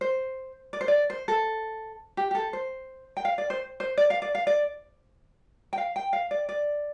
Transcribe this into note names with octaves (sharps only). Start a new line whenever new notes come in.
C5
D5
C5
D5
C5
A4
G4
G4
A4
C5
G5
F5
D5
C5
C5
D5
F5
D5
F5
D5
G5
F5
G5
F5
D5
D5